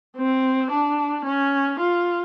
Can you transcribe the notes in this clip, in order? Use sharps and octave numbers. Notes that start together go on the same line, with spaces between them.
C4
D4
C#4
F4